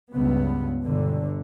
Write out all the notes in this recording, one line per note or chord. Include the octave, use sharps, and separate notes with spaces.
C#2 G2 B3
G1 B2 D3